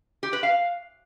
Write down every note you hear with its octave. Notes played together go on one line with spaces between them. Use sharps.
G4
B4
F5